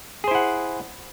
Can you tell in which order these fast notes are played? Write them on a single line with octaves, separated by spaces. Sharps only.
G#4 C5 E4 F#5